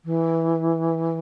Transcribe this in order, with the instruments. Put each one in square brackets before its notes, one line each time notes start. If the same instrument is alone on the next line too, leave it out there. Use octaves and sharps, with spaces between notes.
[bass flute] E3